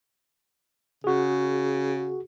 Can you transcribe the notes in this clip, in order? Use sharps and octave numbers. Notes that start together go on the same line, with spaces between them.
C#3 F#4 G#4